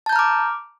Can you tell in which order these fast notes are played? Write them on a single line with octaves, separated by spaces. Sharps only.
A5 G6 A#5 F6 D6